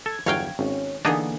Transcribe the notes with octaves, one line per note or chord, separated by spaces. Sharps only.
A4 G#6
G1 E2 F#3 C#5 F5 G5
G#1 C#4
D3 E3 A#3 B3 D4 D#4 G#4